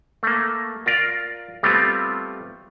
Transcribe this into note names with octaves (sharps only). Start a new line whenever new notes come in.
A3 A#3
F4 A#4 D5 F5
G3 A3 B3 C4 F4